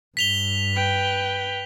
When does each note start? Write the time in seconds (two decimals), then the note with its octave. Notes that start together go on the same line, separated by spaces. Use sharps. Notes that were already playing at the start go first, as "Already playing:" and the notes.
0.17 G2 B6 F7 G7
0.74 B4 G5